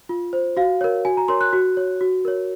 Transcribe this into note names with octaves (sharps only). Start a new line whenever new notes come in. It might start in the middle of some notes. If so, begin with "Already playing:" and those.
F4
C5
F#4 F5
A#4 C#5
F#4 G#5
A#5
A#4 C#5 C6
F#6
F#4
C#5
F#4
A#4 C#5